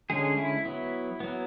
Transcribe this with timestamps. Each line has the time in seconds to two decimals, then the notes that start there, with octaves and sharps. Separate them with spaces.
0.10 D3 G#3 C#4 G#4
0.38 E4
0.65 F#3 B3
1.20 F#3 B3